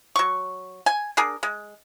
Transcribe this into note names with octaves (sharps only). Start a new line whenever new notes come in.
F#3 C#6
G#5
D4 G#4 A#4
G#3